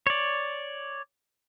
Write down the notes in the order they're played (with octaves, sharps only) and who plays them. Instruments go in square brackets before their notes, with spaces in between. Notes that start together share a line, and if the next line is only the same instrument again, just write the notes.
[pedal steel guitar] C#5 D5